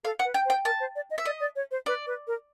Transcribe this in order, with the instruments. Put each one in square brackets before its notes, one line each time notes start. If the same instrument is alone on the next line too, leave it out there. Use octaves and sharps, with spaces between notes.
[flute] A4 [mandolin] F5
[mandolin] F#5
[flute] B4
[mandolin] G5
[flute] C5
[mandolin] G5
[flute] A#4 [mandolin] A5
[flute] C5
D5
D#5
[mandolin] E5
[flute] D5 [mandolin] D#5
[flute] D5
C#5
C5
[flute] B4 [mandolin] D5
[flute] B4
A#4